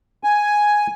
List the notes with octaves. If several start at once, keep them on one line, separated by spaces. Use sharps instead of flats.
G#5